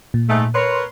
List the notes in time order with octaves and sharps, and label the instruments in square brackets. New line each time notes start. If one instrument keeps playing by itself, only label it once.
[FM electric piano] A#2
[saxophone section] G#2 A3
[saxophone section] A#4 B4 C#5 [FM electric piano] C6